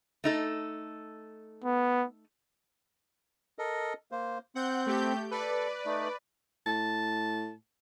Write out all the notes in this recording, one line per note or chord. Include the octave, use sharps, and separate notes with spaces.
A3 D#4 A4
B3
A4 A#4 D#5
A#3 C5
C4 F#5 G6
A3 G4 G6
A4 B4 D5
A3 D#4
A2 A5